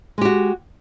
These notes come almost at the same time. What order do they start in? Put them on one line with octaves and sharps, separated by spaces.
G#3 G4 F#4